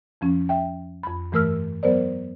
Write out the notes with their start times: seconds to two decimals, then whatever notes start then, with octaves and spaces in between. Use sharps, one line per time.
0.21 F2 F3 C#4
0.49 E5 G5
1.03 F2 B5
1.32 G2 E3 A3 A#4 E6 F6
1.83 F#3 B3 A#4 C5 D5